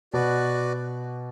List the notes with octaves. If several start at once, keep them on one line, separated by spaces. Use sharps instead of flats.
B2 F#4 B4 D5